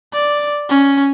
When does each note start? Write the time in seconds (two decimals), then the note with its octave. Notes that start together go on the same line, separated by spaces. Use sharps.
0.13 D5
0.69 C#4